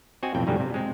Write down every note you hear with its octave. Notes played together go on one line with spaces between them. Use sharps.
C4 F#4 D#5 G#5
B1 F2 A2 G5
F2 G#2 B2 D3 G3
C3
G#3 C4